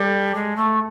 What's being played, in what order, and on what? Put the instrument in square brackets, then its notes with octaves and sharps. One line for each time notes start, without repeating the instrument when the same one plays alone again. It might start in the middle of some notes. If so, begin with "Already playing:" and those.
Already playing: [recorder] G3 [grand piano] A4
[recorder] G#3
A3